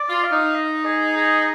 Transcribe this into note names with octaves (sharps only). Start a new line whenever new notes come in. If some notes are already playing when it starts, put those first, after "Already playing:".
Already playing: D5
F4
F5
D#4
D#5
G#4
G#4